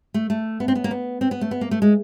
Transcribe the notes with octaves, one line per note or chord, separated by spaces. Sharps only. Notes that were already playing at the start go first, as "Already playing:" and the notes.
A3
A3
B3
C4
B3
A#3
B3
C4
B3
A3
B3
A#3
A3
G#3